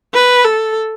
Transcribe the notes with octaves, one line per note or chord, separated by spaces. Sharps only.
B4
A4